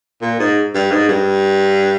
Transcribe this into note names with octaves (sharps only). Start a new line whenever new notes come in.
A#2
G#2
G2
G#2
G2